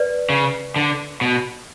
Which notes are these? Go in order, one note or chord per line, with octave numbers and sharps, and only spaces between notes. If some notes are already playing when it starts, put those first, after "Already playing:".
Already playing: B4 D5
C#3
D3
B2